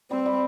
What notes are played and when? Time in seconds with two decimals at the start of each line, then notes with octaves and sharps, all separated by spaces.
0.11 G3 C4
0.26 G3